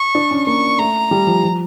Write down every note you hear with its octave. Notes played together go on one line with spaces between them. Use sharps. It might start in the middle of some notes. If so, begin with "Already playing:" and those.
Already playing: C#6
D4
C#4
A#3 C#6
A3 A#5
G3
F3
F3